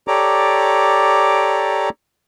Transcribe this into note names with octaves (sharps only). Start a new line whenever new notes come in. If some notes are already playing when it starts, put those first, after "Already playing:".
G4 A4 C#5 D5 A#5 D6